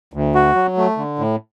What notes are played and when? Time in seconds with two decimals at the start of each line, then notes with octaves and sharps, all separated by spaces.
0.14 D2
0.35 F#4
0.55 F#3
0.77 A3
0.97 D3
1.19 A2